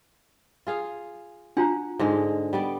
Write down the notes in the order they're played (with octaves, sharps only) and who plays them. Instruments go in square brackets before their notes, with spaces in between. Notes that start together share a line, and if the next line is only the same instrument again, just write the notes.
[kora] F4 G#4 F5
[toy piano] D4 F4 A#5 [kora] F#5
[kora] G#2 D3 G#3
G3 B3 D5